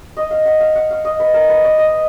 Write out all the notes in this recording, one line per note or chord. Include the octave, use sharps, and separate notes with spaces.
D#5
F5
F#5
F5
F#5
F5
D#5
B4
A#4
B4
D5
D#5